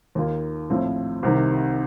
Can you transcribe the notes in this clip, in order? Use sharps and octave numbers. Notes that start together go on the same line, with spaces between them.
D#2 D#3 A#3 F4
A#1 A2 F3 C4
C2 C3 D#3